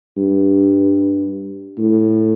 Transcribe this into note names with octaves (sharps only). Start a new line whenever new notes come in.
G2
A2